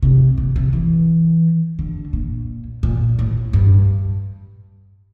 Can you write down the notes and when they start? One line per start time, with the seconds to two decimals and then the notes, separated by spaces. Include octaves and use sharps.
0.03 C3
0.38 A#2
0.56 C3
0.73 E3
1.79 D3
2.13 A#2
2.83 A#2
3.19 A2
3.53 G2